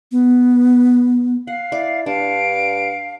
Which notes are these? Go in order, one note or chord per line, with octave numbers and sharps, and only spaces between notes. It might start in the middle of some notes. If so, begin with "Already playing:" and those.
B3
F5 F#5 C7
E4 D5
G2 D4 F5 D7